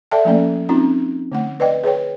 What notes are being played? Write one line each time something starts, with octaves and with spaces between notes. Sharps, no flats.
A4 D5 E5 G5 A5
F3 A3 A#3 C#4 A4 D5
C4 C#4 D#4 F4 A#5
D3 A3 F#5
B4 D5 D#5 G5
G#4 B4 C#5 G5